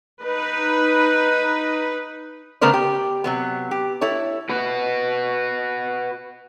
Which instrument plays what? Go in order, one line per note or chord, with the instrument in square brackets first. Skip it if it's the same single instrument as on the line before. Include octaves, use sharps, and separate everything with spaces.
[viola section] D#4 B4
[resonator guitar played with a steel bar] C#3 A3 B3 A#4 C5 D5
G4
C3 F#3 B3
G4
E4 A4 C#5
[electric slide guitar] F#4 B4